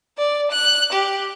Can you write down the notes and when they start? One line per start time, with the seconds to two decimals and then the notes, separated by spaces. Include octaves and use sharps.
0.18 D5
0.51 F#6
0.92 G4